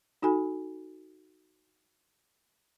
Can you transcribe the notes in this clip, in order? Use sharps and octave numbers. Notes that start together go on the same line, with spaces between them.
D#4 F#4 A4 G#5 B5